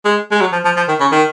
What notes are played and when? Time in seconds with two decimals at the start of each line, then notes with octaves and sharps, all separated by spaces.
0.06 G#3
0.32 G#3
0.41 F#3
0.53 F3
0.65 F3
0.77 F3
0.89 D#3
1.01 C#3
1.13 D#3